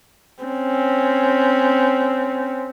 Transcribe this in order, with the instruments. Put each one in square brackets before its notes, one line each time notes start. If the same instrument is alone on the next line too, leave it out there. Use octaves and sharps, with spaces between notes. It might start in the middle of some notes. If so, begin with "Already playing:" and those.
[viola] C4 C#4